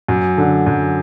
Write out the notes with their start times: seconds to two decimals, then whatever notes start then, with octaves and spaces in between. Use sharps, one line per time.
0.08 F#2
0.38 D3
0.66 F#2